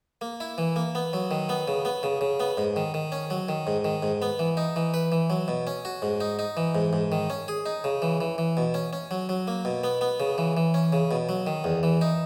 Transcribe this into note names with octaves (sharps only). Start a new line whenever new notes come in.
A#3
E4
E3
A#3
B3
F#3
D#3
B3
C#3
B3
C#3
C#3
B3
G#2
D#3
D#3
C#4
F#3
D#3
G#2
D#3
G#2
B3
E3
D#4
E3
B4
E3
F#3
B2
C#4
F#4
G#2
D#4
D#4
E3
G#2
G#2
D#3
C#4
G#4
D#4
C#3
E3
E3
E3
B2
C#4
C#4
F#3
F#3
A#3
B2
B3
B3
C#3
E3
E3
C#4
C#3
B2
F#3
D#3
E2
E3
D#4